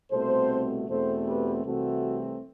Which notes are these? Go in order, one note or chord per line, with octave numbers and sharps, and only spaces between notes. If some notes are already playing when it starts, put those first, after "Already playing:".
C2 B2 A3 C4 A4 C5
E2 B2 A3 C4 A4 C5
G4 B4
C2 C3 E3 A3 C4 F#4 A4